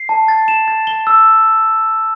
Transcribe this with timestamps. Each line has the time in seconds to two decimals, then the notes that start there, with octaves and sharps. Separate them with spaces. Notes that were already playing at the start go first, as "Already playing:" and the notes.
Already playing: C7
0.09 A5
0.28 A6
0.48 E7
0.68 A6
0.87 G7
1.07 E6